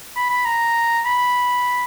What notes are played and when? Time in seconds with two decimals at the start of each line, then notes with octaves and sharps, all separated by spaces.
0.16 B5
0.31 B5
0.46 A#5
1.06 B5